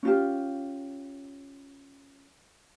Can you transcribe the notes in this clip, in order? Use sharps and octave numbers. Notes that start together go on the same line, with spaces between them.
C#4 F4 G4